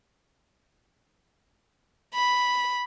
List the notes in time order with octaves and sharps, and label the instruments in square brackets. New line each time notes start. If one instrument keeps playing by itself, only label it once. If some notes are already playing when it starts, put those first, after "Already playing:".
[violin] B5